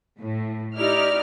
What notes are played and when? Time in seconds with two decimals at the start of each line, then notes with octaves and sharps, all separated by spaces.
0.19 A2
0.78 D#4 E4 G4 D5 F6